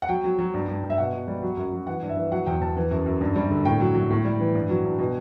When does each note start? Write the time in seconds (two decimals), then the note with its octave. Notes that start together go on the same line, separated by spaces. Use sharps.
0.02 F#5
0.09 F#3 G5
0.24 F#3
0.39 F#3
0.54 G2
0.68 G2
0.84 G2
0.90 E5
0.98 B2 F#5
1.13 B2
1.27 G3
1.42 F#3
1.57 F#2
1.72 F#3
1.87 E3 F#5
2.02 G2
2.09 E5
2.17 E3
2.31 F#3 F#5
2.46 E2 G5
2.61 E2 A5
2.77 E3
2.91 F#2
3.06 F#2
3.21 G2
3.36 G3
3.50 D3
3.65 A2 G5
3.80 F#3
3.95 F#3
4.10 A2
4.25 G3
4.40 E3
4.55 G2
4.69 F#3
4.85 G2
4.99 B2